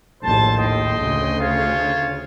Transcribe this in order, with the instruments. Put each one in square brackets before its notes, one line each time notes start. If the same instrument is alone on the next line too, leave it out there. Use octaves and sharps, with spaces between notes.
[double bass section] A#1 D#2 A2 [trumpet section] C5 A5
[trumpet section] D#5 G5 C6
[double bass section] D2 C#3
[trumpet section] F4 C5 C#5